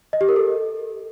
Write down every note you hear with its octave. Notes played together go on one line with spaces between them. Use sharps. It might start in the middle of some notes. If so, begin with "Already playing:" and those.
D#5
G4
A#4
A4